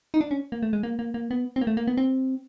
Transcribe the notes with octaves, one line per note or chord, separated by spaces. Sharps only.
D#4
D4
C#4
A#3
A3
G#3
A#3
A#3
A#3
B3
C4
A#3
A3
A#3
B3
C4